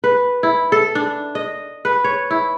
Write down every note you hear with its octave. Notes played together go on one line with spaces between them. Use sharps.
B4
E4
A4
D4
D#5
B4
C#5
E4